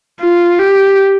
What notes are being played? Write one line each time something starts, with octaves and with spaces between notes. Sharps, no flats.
F4
G4